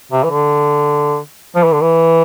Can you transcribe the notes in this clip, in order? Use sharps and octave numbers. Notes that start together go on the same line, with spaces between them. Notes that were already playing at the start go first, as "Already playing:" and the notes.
C3
E3
D3
F3
E3
D3
E3